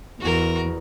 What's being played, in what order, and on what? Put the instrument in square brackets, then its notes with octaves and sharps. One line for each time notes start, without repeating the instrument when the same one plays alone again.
[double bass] E2 [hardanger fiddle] F#4 A#4